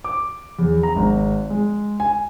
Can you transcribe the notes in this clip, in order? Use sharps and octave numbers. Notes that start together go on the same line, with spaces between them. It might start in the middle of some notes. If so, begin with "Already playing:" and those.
D6
E2
A#5
G#1
G#3
G#5